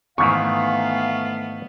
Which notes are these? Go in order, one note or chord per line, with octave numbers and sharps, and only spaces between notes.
G#2 D#3 E3 A3 B3 F5 C#6